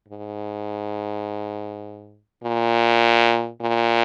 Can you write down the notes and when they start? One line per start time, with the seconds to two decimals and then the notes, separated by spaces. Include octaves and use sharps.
0.08 G#2
2.44 A#2
3.61 A#2